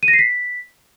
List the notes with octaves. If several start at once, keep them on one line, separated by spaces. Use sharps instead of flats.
D#7
A#6
C7
B6